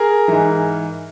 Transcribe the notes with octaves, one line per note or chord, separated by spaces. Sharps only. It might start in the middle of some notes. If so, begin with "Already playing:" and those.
Already playing: G#4 A#4
G#2 E3